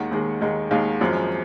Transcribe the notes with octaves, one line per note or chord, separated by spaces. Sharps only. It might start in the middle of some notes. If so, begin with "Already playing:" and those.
Already playing: D#2 D#3 G#3 F#5
D#2 D#3 G#3
D#2 D#3 G#3
D#2 D#3 G#3 F5
G#1 F#2 F3 G#3